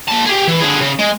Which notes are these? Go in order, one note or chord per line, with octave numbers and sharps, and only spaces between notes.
A#3 A5
G4 G#4
E3
D3 G#4
C#3
G#3